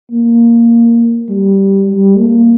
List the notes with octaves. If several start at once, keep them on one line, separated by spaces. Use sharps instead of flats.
A#3
G3
G3
A#3